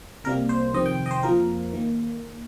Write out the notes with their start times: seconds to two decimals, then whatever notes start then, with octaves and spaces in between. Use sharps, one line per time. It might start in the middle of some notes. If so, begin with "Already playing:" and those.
0.24 C2 C3 G3 A#3 A#4
0.49 C5
0.74 F2 C3 D#3 C4 D#5
0.86 G5
1.06 D#5
1.11 C5
1.23 F2 F3 A#3 A#4
1.73 D#3 A#3